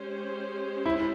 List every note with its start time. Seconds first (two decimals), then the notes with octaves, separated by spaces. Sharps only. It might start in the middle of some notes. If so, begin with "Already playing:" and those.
Already playing: G#3 C#4 G4 C5
0.86 E4